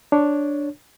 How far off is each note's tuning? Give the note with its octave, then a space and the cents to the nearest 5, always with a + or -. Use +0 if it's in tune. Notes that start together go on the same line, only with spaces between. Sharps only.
D4 +0 C#5 +5